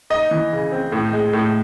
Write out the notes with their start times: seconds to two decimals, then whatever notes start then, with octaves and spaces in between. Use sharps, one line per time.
0.10 D#4 D#5
0.31 E3
0.52 C#3
0.72 C4
0.92 A2
1.13 G#3
1.33 A2